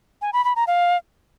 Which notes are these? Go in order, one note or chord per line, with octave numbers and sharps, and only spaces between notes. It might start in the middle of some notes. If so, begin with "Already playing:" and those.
G#5
B5
B5
A#5
F5